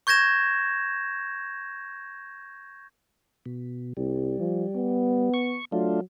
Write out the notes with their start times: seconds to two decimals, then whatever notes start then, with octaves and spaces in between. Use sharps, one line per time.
0.07 C#6 G6 G#6 A#6 E7
3.46 B2
3.97 C2 G3
4.40 F3
4.76 B3
5.34 C#6
5.72 F#3 A3 D4 F4